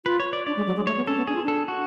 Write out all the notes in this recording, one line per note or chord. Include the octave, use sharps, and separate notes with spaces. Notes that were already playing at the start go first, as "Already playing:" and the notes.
F4 B4
C#5
D5
D4 D5
G#3
F#3
G#3
A3 C#5
B3
C#4 A4
B3
D4 G#4
F4
D4
A4
F#4